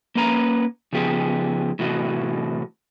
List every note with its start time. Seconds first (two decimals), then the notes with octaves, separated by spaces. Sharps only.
0.15 A#3 C#4 B4 A#5
0.93 C#3 F3 B3 G4 G#4
1.79 A2 C3 E3 F#4